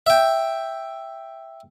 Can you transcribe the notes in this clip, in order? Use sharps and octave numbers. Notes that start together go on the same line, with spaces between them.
E5 G5